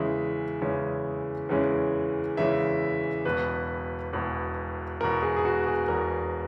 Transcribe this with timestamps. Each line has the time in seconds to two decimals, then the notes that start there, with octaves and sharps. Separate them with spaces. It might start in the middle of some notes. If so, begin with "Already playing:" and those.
Already playing: E2 C#3 E3 G#3 C#4 E5
0.61 E2 C#3 E3 G#3 C#4
1.49 E2 C#3 E3 G#3 C#4
2.37 E2 C#3 E3 G#3 C#4 E5
3.25 E1 E2 B2 B4
4.13 E1 E2 B2
5.01 E1 E2 B2 A#4
5.22 G#4
5.36 G#4
5.45 F#4
5.67 G#4
5.88 E1 E2 B2 A#4